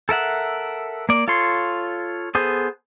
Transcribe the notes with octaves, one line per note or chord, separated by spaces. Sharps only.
A4 A#4 E5 F#5
A#3 D5
F4 A4 C#5 C6
B3 G#4 A4 C5